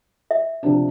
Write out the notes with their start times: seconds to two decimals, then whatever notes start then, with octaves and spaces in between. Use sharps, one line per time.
0.31 E5
0.63 C3 F3 D4